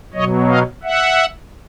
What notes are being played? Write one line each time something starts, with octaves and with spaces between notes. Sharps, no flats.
B2 F#3 C#5 D#5
D#5 F5
E5 F#5